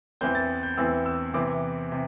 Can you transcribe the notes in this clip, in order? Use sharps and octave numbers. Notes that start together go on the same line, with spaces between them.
E2 E3 C4 G6
A6
G6
E2 E3 C4 E6
E6
E2 C3 E3 C4 D6
C3